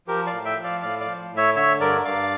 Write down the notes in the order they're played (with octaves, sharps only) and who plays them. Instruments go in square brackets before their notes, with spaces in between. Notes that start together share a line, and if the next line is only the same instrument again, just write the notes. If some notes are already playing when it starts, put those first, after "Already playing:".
[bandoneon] F3 G4 A#4
D5 F5
A2
E5 G5
F3
D5 F5
A2 D5 F5
D5 F5
F3
A2
C#5 E5
D3 C#5 E5
G2 A#4 D5
G2 D5 F5